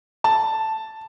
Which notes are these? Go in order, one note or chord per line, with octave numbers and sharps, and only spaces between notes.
A5